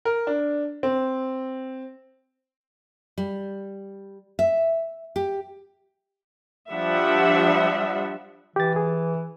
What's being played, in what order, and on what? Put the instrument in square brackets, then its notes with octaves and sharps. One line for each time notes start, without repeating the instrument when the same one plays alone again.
[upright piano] A#4
D4
C4
[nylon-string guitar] G3
E5
G4
[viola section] F3 G3 D4 E5 F#5
[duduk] E3 [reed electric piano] G4 A6
[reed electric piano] G#4